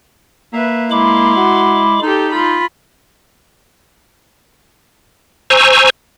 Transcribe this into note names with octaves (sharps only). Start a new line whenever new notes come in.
A#3 B4 E5
G#3 E4 B5 C6 D6
F#4
D#4 G4 A4
F4 B5
C5 G#5 A#5 C#6 E6